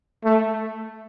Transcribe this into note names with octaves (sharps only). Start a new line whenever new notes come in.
A3